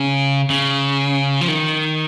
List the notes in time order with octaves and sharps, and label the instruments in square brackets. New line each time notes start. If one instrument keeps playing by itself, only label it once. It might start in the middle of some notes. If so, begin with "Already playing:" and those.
Already playing: [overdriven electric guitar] C#3
C#3
F3
D#3